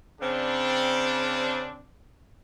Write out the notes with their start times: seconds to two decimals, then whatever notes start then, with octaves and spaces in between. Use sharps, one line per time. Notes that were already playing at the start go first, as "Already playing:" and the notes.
0.20 C#3 C4 D4